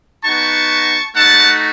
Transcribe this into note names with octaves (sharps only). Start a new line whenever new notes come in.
B3 D#4 F#4 A5 C#6
A3 D#4 F#4 F#5 A5